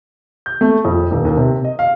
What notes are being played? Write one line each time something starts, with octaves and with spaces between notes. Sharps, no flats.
G6
A3
F2
D#1
D#2
C3
D#5
F5